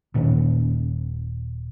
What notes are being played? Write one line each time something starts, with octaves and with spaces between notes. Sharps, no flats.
D#1 A#2 D#3 C#4